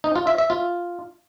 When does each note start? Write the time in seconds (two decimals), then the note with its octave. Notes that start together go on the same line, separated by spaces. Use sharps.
0.04 D#4
0.16 F4
0.27 E5
0.38 E5
0.50 F4